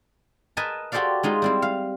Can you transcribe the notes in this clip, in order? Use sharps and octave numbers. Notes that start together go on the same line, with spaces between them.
A#4 B4 D#5 G#5 A5
F#4 G4 A4 C5 D5 F5
G#3 D#4 F4
G3 C4 E4
F5